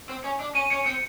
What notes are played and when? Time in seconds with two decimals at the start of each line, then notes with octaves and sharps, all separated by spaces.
0.09 C4
0.24 C#4
0.40 D4
0.55 C#4 D#7
0.70 C#4 C#7
0.86 C4 C#7